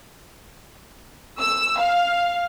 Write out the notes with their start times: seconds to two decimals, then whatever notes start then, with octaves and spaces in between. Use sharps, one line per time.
1.39 E6
1.78 F5